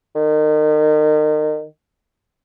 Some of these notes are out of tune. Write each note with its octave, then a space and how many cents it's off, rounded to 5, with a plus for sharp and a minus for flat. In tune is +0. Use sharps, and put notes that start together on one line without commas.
D#3 -30